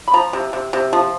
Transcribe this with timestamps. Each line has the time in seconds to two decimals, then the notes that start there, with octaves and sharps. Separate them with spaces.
0.08 B5
0.14 F3 A#5
0.33 C3
0.53 C3
0.73 C3
0.93 F3